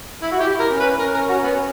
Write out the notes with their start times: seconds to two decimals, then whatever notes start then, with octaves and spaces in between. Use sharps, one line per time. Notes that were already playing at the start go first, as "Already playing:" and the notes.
0.22 E4
0.32 F#4
0.40 E4 G4
0.59 A#4
0.70 C#4
0.80 B4
0.99 C#4 A#4
1.14 A#4
1.29 F#4
1.44 B3